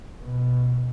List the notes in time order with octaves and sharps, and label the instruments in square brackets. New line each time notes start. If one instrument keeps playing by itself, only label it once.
[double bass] B2